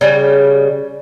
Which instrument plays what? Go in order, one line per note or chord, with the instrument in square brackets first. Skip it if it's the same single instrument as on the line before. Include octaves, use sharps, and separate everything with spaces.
[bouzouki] C#3 G3